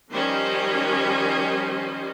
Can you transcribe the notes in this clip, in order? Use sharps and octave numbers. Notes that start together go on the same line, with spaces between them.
D#3 F3 G3 C#4 C5 D#5